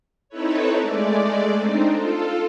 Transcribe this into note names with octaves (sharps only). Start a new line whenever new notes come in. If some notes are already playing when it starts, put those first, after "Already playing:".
C4 D#4 E4 A4 B4 C#5
G#3 A3 D5
C4 D4 D#4
F4 A4